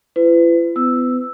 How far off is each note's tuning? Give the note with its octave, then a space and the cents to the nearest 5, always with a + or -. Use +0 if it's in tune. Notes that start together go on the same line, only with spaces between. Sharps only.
E4 +45 B4 +35
B3 +35 E6 +0